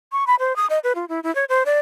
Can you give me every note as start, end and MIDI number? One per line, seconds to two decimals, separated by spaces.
0.12 0.24 85
0.27 0.35 83
0.39 0.55 72
0.56 0.66 87
0.70 0.79 75
0.84 0.93 71
0.95 1.05 65
1.09 1.20 64
1.23 1.33 64
1.35 1.45 73
1.49 1.63 72
1.66 1.80 74